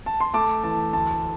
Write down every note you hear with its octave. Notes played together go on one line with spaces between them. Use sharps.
A5
C6
A3 A5 D6
E3 A5
D2 A5